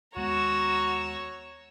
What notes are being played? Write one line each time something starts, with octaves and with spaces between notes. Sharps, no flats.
D#2 G#3 B3 F#4 C#5 A#5 E6